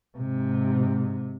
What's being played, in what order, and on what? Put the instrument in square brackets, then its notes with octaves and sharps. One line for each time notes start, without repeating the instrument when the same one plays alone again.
[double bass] G#2 C3